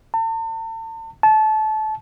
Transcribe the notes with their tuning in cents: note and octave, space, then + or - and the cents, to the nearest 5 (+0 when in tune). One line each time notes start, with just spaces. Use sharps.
A5 +40
A5 -25